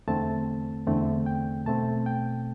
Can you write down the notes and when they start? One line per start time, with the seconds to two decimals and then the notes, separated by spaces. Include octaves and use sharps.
0.08 E2 D3 A3 C4 A5
0.87 E2 D3 A3 C4
1.26 G5
1.66 B2 A3 C4 A5
2.06 G5